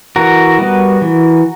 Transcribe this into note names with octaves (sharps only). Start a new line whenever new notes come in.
E3 F#4 A#4
G3 B3
E3